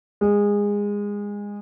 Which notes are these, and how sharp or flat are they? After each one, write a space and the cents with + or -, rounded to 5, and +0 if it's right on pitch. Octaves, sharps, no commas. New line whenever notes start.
G#3 -20